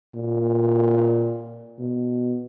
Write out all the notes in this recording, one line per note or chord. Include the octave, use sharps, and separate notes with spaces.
A#2
B2